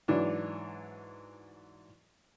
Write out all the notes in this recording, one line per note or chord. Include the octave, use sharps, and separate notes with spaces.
G#2 E3 F#3 D4